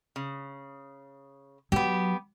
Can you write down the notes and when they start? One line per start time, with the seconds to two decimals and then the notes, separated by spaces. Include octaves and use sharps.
0.16 C#3
1.72 F#3 B3 G4